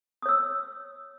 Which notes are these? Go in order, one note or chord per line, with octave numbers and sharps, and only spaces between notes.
C#5 D#6 E6